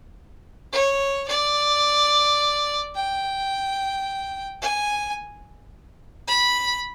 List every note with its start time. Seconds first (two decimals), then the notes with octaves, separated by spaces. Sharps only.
0.72 C#5
1.28 D5
2.95 G5
4.61 G#5
6.27 B5